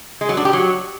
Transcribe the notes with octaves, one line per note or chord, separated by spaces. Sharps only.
G#3
F#3
D4
G4
F#3